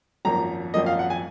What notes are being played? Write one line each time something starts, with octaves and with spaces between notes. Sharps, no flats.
G#1 F#2 F3 A#3 A#5
G#1 F#2 F3 A#3 D#5
F5
F#5
G#5